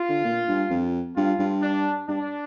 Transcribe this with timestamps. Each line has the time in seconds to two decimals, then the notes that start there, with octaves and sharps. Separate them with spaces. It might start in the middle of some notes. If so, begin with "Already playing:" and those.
Already playing: F4
0.09 D3
0.24 A#2
0.48 G2
0.70 F2
1.16 G2 F4
1.39 G2
1.62 D4
2.08 G2 D4